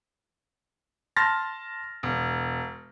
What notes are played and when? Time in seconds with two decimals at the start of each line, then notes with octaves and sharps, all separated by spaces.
1.16 A5 C6 F6 A6 A#6
2.03 E1